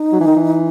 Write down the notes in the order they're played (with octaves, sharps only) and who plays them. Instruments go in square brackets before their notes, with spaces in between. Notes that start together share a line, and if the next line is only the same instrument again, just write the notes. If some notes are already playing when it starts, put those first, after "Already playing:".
Already playing: [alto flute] D#4
[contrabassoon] F#3
E3
D#3
E3